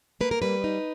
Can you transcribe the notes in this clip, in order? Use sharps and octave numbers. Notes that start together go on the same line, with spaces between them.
A#3 B4
A#4
G3 B4
D#4